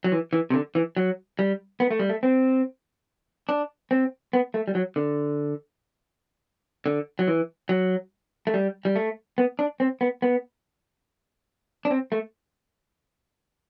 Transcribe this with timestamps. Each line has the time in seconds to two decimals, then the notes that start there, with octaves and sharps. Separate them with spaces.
0.04 F#3
0.12 E3
0.33 E3
0.50 C3
0.54 D3
0.75 E3
0.97 F#3
1.39 G3
1.80 B3
1.91 A3
1.99 G3
2.10 A3
2.23 C4
3.49 D4
3.91 C4
4.33 B3
4.54 A3
4.68 G3
4.75 F#3
4.96 D3
6.86 D3
7.19 F#3
7.28 E3
7.69 F#3
8.47 A3
8.54 G3
8.85 G3
8.96 A3
9.38 B3
9.59 D4
9.80 C4
10.01 B3
10.22 B3
11.85 D4
11.91 C4
12.12 A3